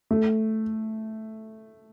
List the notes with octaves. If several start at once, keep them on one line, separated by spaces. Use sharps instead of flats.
A3